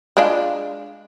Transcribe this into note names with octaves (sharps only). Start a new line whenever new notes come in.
G#3 D4 F4